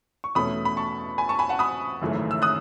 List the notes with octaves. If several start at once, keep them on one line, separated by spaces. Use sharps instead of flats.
C#6
E2 B2 A3 C#4 B5 D#6
B5
A5 C#6
G#5 B5
A5 C#6
G#5 B5
F#5 A5
B5 D#6
G#1 F#2 C#3 E3 A3
E6
D#6 F#6